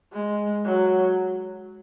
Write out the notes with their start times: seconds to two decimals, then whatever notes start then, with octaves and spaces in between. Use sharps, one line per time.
0.13 G#3
0.65 F#3